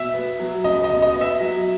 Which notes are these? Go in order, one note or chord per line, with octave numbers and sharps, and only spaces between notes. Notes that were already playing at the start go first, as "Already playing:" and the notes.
Already playing: B2 E5
B3
F#3
C#2 D#5
D#5
B2
D#5
B3
E5
F#3